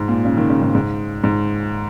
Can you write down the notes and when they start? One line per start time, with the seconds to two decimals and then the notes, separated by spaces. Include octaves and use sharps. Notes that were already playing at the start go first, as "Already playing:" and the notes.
Already playing: G#2
0.08 A#2
0.25 C#3
0.37 D#3
0.49 C#3
0.61 G#2
0.75 G#2
1.24 G#2